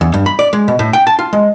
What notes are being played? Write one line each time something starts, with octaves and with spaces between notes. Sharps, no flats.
E2
G2
B5
D5
G#3
B2
A2
G5
A5
F4
G#3